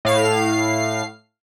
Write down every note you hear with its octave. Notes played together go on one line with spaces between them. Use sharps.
A2 F5 C7